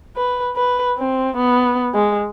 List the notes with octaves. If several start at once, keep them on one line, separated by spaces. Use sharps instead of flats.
B4
B4
C4
B3
G#3